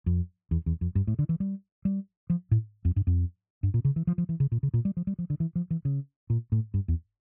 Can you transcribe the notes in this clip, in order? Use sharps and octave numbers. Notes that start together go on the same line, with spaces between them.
F2
E2
E2
F2
G2
A2
D3
E3
G3
G3
F3
A2
F2
G2
F2
G2
A#2
C#3
E3
F3
F3
E3
C#3
A#2
C#3
A#2
G3
F3
G3
F3
D3
E3
F3
E3
C#3
A#2
A2
G2
E2